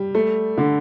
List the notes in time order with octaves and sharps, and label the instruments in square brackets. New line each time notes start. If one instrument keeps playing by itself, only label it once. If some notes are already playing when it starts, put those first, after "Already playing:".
Already playing: [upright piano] G3
A3
D3